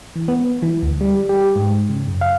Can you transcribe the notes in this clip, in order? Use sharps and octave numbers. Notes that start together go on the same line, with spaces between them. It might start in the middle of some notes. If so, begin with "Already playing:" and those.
E3
B3
E3
D2
G3
G4
G#2
C#3
F#2
F5